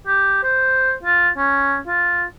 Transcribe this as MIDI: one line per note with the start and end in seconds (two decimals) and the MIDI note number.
0.07 0.39 67
0.43 0.93 72
1.03 1.28 65
1.37 1.77 61
1.87 2.24 65